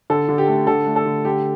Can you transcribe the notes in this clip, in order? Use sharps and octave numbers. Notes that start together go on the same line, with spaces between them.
D3 A4
D3
G4
A3
D3 A4
A3
A4
D3
D3 G4